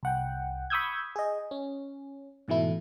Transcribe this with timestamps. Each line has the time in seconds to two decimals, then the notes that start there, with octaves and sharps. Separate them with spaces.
0.03 C2 F#5 G5
0.70 B5 C#6 D#6 E6 G6 G#6
1.16 G#4 D#5
1.51 C#4
2.48 G#2 B2 E3 A3 E4